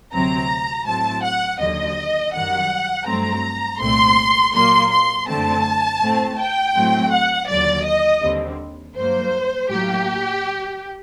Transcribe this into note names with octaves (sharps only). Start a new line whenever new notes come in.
D2 C3 F#3 C4 A#5
A2 F#3 C4 A5
F#5
D#2 D3 F#3 D#5
F#2 D#3 G3 F#5
G2 F#3 A3 C4 A#5
C2 A#2 A3 C4 C6
A#2 F#3 A#3 C6
C6
F#2 D3 A3 C4 A5
A2 A3 C4
G5
A2 F#3 A3 C4
F#5
D#2 D3 F#3 D5
D#5
D#2 D3 G3 C4
G2 F#3 A#3 C5
A2 F#3 A#3 G4